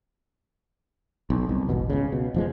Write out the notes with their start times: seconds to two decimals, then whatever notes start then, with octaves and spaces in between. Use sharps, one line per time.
1.30 B1
1.49 C2
1.69 D#1 G#1 B2
1.90 C#2 C#3
2.12 B2
2.34 F1 F3 G#3